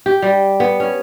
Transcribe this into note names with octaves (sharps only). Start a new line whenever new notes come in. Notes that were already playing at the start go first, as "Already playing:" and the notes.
G4
G3
B3
C#4